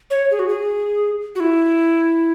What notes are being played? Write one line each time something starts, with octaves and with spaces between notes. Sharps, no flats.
C#5
G#4
F#4
G#4
F#4
E4